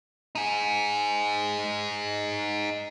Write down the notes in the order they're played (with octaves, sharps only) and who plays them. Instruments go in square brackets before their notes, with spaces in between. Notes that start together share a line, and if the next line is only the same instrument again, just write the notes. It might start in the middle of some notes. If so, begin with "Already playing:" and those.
[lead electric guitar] D#4 G#4